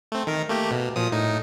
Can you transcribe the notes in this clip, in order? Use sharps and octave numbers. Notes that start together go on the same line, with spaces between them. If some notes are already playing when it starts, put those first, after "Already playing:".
A3 C4
D#3 A#4
A3 A#3 G4
B2
A#2 F3 D#6
A2 D#4